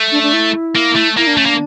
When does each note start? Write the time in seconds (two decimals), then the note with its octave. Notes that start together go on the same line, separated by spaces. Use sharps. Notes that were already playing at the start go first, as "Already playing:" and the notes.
Already playing: A3
0.12 D4
0.23 D4
0.33 E4
0.75 A#3
0.95 A3
1.17 A#3 E4
1.27 D4
1.37 A3 C#4
1.46 A#3 D4